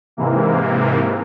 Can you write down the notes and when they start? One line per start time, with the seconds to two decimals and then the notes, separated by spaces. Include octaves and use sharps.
0.17 G#2 C3 E3 A#3